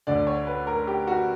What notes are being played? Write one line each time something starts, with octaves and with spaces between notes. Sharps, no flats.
D2 D3 D5
C#5
B4
A#4
G4
F#4